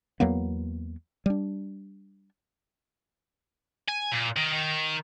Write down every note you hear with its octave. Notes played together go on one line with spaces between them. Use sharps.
E2 F#3 A#3 B3
G3 D4
G#5
A#2
D#3
D#3